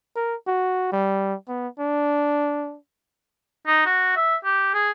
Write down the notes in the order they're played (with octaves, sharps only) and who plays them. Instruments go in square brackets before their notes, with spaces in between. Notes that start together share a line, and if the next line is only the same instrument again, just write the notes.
[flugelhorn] A#4
F#4
G3
B3
D4
[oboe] D#4
F#4
E5
G4
G#4